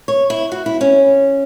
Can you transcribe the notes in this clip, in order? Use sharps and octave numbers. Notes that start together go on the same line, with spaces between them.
C#5
E4
F#4
E4
C#4